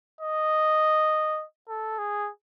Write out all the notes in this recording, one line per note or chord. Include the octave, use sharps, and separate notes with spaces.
D#5
A4
G#4